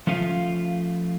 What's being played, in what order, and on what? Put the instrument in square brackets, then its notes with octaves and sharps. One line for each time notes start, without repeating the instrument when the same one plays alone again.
[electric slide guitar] F3 A3 C#4 F4 F5